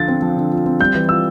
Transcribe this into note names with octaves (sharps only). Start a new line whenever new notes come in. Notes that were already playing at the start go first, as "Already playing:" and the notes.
Already playing: D3 F3 F4 A6
C4
F3
D3
F4
C4
G3 G6
E3
F4 E6